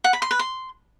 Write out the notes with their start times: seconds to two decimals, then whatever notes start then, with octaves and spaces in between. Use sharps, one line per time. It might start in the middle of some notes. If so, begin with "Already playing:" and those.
0.04 F#5
0.13 B5
0.22 C6
0.31 B4
0.39 C6